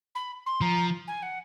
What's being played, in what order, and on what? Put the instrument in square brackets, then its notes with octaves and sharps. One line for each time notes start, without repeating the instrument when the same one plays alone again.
[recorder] B5
C6
[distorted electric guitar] F3 [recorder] A#5
[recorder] G#5
F#5